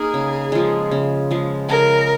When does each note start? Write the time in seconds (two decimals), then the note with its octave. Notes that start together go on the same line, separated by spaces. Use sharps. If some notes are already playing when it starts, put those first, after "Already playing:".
Already playing: A#3 D#4 G#4 A#4
0.14 C#3
0.52 F3 G#3
0.91 C#3
1.31 F3 G#3
1.69 C#3 A#4